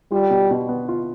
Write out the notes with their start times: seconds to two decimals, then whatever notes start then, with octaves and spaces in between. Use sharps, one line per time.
0.12 G3 F4
0.30 B2
0.51 B2
0.69 B3
0.89 F4